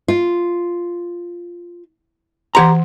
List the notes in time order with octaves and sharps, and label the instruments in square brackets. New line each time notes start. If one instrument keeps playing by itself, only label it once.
[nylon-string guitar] F4
[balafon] E3 F#5 C6 [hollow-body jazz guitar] G4 A#5